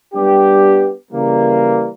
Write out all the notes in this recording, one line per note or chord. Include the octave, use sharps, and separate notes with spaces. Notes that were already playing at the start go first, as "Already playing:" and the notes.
G3 B3 D4 G4
C#3 E3 G3 A#3